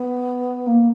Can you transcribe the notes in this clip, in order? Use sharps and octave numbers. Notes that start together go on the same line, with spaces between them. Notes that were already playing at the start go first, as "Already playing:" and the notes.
Already playing: B3
A#3